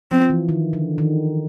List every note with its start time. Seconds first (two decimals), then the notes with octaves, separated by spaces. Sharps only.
0.11 F3 C4
0.30 E3
0.49 D#3
0.73 D3
0.98 D#3